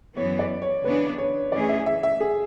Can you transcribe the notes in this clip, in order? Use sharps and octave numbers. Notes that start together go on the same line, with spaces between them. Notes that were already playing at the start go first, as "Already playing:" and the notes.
F#2 E3 B3 C#5
D5
C#5
C#3 E3 B3 D4 B4
C#5
E3 A3 C#4 G#4 D5
E5
E5
E5
G#4